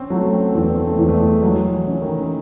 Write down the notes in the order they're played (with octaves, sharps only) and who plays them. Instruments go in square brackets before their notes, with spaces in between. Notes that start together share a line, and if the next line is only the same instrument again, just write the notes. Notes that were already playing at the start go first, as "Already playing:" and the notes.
Already playing: [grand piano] C4 C#4
[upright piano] F#3 [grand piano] A3
[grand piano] C4
[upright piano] E2 [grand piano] C4
[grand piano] A3
C4
[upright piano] E2
[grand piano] A3
G#3
[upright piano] F#3 [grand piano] G#3
[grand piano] E3
[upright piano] C#4
[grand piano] D#3